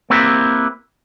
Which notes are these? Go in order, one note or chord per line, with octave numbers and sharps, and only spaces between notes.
A#3 C4 E4 G4 B4